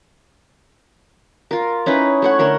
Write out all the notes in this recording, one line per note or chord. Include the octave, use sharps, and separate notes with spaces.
F4 A#4
C#4 D#4 E4 B4
A3 C#5 F#5
D3 A3 A#4 C#5